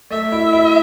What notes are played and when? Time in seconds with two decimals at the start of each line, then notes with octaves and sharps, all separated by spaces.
0.10 A3 E5
0.32 E4
0.53 E4